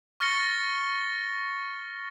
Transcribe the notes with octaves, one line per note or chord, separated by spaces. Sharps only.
C#6 F6 A6 A#6 C#7 G7